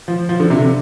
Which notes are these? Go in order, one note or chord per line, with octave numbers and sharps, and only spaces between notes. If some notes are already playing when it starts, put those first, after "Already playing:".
F3
F3
D3
C3
D3